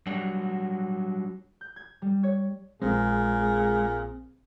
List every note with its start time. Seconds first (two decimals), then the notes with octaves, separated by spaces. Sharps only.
0.07 F#3 G3 D4 F#4
1.61 G6
1.76 G#6
2.02 G3
2.23 C#5
2.82 A#1 A#2 G#3 C4 G#4